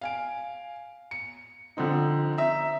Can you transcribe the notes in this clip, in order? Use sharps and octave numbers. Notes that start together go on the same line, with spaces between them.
F5 G#5 D7
C#7
D3 F3 C4 D#4
E5 A#5